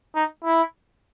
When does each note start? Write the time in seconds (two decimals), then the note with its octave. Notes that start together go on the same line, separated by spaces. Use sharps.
0.15 D#4
0.44 E4